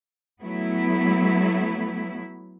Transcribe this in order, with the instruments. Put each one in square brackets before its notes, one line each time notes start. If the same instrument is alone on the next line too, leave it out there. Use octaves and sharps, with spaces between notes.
[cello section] F#3 A3 B3 E4